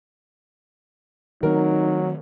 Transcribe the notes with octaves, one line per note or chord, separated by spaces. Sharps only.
D#3 F#3 A3 C4 D#4 A#4